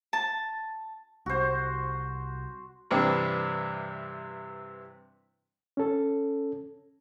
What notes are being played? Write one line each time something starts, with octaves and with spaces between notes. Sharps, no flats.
A5
C2 F#4 C5
G2 C3 E3 C4 D4
C#4 A4